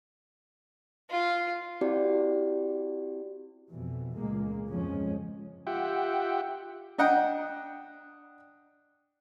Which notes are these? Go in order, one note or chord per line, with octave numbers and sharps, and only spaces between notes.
F4
C4 E4 F#4 G4 D5
F2 B2 E3
C#2 A#2 G#3 A#3
G1 F2 F3 G#3 C#4
F4 G4 E5 F#5 G5
D4 D#5 F#5 G5